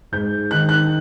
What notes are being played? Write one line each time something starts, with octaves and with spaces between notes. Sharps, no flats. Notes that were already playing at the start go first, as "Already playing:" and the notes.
G#2 G6
D#3 F#6
F#6